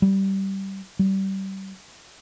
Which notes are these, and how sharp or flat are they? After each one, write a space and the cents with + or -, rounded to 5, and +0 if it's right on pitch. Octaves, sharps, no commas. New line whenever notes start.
G3 -15
G3 -25